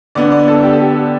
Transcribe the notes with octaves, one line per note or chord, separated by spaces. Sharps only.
D3 B3 D4 D5
D5
A4
G4
A4
G4